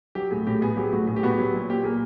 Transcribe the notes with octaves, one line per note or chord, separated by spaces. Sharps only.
F#3 G4
A2 G#4
A2 G4
B3 G#4
F#3 G4
A2 F#4
A2 G#4
G4
B3 F#4
G4
F#3
A#2
A#2 G4
A#3 G#4